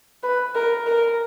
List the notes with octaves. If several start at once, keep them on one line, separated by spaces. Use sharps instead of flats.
B4
A#4
A#4